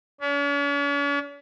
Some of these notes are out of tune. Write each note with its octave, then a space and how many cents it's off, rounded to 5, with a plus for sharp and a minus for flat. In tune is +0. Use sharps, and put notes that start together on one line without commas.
C#4 +45